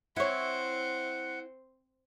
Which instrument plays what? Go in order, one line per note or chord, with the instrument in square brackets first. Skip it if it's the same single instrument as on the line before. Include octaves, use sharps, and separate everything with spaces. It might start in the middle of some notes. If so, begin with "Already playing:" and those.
[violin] C4 C5 [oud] E4 C#5 [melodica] F#5